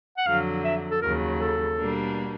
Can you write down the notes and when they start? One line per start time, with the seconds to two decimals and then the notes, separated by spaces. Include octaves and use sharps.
0.17 F#5
0.27 F2 D3 F#3 F5
0.64 E5
0.91 A4
1.02 D#2 C#3 F#3 A#4
1.40 A4
1.77 B2 G3 A#3 D4